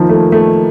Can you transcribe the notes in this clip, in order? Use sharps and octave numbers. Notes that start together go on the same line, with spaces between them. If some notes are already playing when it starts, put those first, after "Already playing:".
Already playing: D#3 F3 A#3
A3
A3